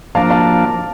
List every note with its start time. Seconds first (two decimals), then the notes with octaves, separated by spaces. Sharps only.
0.15 F3 A#3 D4 F5 A5
0.30 F5 A5